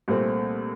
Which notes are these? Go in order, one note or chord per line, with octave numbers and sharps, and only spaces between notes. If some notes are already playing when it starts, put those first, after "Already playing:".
C2 A#2 A3 C4